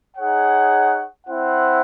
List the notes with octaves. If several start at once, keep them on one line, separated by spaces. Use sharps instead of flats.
D#4 G#4 C#5 F#5
C4 E4 C5 F#5